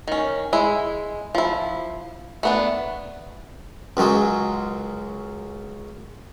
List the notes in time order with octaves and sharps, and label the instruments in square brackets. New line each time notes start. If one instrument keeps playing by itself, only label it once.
[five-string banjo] D#3 C#4
G#3 E4
F3 E4
A3 B3 D4
[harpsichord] C#2 F#2 F#3 G#3